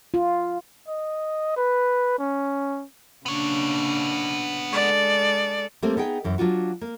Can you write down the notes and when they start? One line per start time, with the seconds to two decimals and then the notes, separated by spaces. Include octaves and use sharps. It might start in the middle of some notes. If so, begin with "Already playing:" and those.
0.14 F4
0.88 D#5
1.56 B4
2.19 C#4
3.26 C#3 A#3 B3 D4 C#5
4.73 G#3 A4 D5
5.82 G3 A3 A#3 C4 C5
5.97 B3 D#4 G#4 G5
6.24 F#2 E3
6.38 F#3 D4 F4 F#4
6.81 A#3